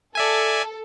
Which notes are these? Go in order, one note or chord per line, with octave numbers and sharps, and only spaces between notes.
A4 D5 E5 G#5